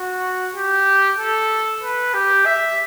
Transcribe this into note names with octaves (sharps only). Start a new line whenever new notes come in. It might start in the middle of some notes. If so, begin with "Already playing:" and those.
Already playing: F#4
G4
A4
B4
G4
E5